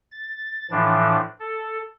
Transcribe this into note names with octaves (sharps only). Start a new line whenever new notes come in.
A6
A2 E3 F3 D4
A4